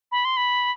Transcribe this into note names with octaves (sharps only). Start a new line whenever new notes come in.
B5
C6
B5